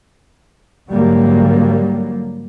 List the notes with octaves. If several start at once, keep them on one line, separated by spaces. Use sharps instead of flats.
G#2 D3 F#3 G3 A#3